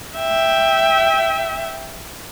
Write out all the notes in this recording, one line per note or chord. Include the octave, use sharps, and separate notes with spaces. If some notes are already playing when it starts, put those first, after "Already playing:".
E5 G5